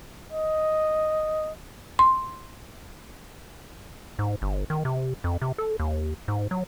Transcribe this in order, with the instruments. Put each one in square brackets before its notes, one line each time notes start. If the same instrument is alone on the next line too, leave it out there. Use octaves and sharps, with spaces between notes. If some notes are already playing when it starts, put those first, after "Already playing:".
[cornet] D#5
[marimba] C6
[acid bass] G#2
G1
D#3
C3
F2
C3
A4
D#2
G#2
F#3